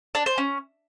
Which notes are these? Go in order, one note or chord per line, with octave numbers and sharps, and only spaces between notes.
D4
C5
C#4